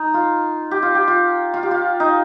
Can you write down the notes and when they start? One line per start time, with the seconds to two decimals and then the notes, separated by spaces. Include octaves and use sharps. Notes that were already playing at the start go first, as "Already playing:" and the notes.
Already playing: D#4
0.14 F4
0.71 G4
0.83 F4
0.95 G4
1.08 F4
1.54 F4
1.63 G4
1.71 F4
2.00 D#4